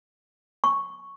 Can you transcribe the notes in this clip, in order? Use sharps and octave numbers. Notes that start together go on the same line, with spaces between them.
C#6